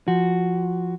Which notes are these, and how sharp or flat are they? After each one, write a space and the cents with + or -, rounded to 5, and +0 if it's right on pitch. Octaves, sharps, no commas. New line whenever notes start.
F3 +0 F#4 +0